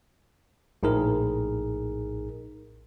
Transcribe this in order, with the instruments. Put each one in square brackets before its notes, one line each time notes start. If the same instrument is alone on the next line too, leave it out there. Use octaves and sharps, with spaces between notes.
[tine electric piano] A#1 A2 D#4 G#4 A#4